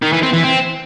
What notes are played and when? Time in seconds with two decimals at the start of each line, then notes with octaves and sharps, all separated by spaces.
0.02 D#3
0.13 E3
0.23 C4
0.34 E3
0.44 C4